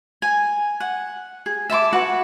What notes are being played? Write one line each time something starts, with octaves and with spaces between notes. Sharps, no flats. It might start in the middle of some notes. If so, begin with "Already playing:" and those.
G#5
F#5
G#4
E5 A5 C6 D6
F#4 B4 F#5 C#6